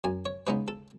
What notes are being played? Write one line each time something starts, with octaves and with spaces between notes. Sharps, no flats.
F#2 G#5
C#5
C#3 G#3 B3 D#4 B4
A4